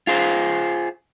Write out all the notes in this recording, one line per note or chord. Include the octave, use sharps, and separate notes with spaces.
F4 G#4 C5